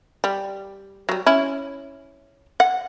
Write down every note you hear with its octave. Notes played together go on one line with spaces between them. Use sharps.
G3
F#3 G3
C#4 E4
F#5